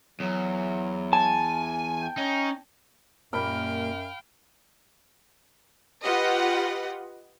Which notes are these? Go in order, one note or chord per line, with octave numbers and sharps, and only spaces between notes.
E2 F#3
G#5 A5
G5
C#4 D#4
F#2 A#2 G3 A#3 F5 G5 B5 F6
F4 G4 B4 D#5 F#5